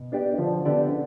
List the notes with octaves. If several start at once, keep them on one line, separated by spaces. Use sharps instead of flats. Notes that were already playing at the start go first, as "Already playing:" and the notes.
Already playing: B2
B3 D4 G4 D5
D3 F3
D3 B3 D4 G4 D5